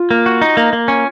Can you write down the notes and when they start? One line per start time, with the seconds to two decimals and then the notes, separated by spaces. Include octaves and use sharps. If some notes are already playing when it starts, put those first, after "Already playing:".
Already playing: F4
0.11 A#3
0.26 F#4
0.41 D#4
0.57 A#3
0.73 A#3
0.88 C#4